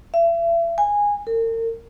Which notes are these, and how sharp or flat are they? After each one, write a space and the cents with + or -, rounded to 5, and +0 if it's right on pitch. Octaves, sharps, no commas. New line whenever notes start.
E5 +40
G#5 -15
A#4 -40